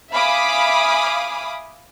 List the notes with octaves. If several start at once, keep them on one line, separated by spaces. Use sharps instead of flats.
E5 F5 G#5 B5 D6 D#6